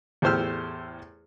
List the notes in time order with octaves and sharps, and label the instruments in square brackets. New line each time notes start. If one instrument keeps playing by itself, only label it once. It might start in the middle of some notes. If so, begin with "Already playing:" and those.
[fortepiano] E2 A2 G4 C5 E6 F6